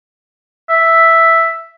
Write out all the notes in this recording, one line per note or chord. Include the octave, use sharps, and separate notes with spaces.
E5